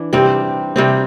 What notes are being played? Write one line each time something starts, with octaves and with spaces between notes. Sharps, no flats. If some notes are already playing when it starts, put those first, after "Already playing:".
Already playing: E3 D4
C3 G3 C4 G4
C3 G3 C4